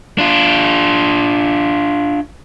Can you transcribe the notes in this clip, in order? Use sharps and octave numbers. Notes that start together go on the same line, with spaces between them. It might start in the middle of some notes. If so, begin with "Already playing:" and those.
D4 F4